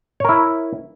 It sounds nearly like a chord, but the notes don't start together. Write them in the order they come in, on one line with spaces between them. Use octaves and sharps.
C#5 A#4 E4